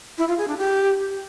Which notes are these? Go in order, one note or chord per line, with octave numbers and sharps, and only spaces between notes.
E4
F4
G#4
D4
G4